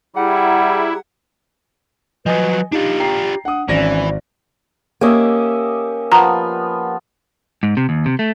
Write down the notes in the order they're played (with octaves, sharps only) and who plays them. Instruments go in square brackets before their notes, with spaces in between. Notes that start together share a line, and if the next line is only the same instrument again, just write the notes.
[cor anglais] G3 [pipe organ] E4 [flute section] G4 G#4 A#5 [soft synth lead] F#5
[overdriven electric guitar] F3 F#3 [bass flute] B4 [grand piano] D#5 G#5 D#6
[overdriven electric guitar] D4 F4 [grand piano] D#4 [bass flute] G4
[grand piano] G5 A#5 C7
[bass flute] D4 [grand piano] F#5 D#6
[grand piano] G#1 D5 A#6 [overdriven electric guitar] E3 [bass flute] C#4
[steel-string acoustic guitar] A#3 C#4 [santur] G4 D#5 E5
[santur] F3 B3 [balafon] A#5
[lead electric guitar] G#2
C3
D#2
C3
A3